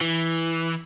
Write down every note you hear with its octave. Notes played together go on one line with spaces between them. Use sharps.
E3